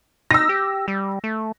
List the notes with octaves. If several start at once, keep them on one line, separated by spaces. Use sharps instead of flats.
D#4 E6 A#6
G4
G3
A3